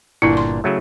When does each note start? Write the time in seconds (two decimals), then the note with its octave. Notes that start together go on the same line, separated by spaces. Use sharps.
0.22 G1 A#2 D4 E4
0.37 C6
0.64 C#3 F#3 A3